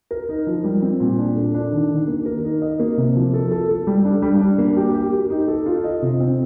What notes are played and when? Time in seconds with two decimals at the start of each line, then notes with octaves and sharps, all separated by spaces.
0.11 A#4
0.29 D#4
0.47 F3
0.64 G3
0.82 C4
1.00 A#2
1.18 D4
1.36 A4
1.54 D4
1.72 D#3
1.90 D#3
2.08 A#3
2.26 A#4
2.44 D#4
2.62 D#5
2.80 A#3
2.97 C3
3.15 F3
3.34 A4
3.51 A4
3.69 A4
3.87 G3
4.05 D4
4.22 G3
4.41 D4
4.58 A#3
4.77 G4
4.94 G4
5.13 G4
5.30 D#4
5.48 A4
5.66 F4
5.84 D#5
6.02 C3
6.20 C4